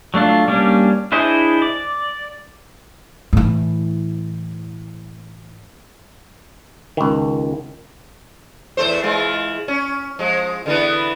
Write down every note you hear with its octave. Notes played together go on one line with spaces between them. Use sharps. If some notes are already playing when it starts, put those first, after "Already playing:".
F#3 A3 D4 F4
G3 A#3 C#4 D4
D4 E4 G#4 C5 D#5
D5
A2 E3
C#2 D#3
E2 A3 C5
E3 G#3 F4
C#4
F3 G#3
D3 E3 B3